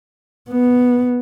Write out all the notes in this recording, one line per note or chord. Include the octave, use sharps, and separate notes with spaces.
B3